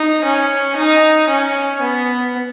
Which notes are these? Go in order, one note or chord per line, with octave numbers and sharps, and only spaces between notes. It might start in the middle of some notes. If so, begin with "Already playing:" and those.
Already playing: D#4
C#4
D#4
C#4
B3